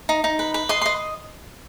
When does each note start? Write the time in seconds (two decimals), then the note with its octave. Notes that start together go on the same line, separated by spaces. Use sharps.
0.09 D#4
0.24 D#4
0.39 B4
0.54 B4
0.69 D#5 C6
0.81 D#5 C6